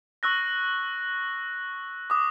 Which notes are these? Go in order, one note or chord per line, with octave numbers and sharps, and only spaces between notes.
C#6 E6 F#6 A#6
D6 D#6